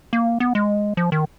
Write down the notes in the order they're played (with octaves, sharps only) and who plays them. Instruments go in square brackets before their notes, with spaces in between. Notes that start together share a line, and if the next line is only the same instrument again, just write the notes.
[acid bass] A#3
B3
G#3
F3
D#3